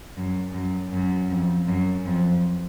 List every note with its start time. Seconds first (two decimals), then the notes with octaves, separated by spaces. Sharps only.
0.17 F#2
0.54 F#2
0.93 F#2
1.30 F2
1.67 F#2
2.06 F2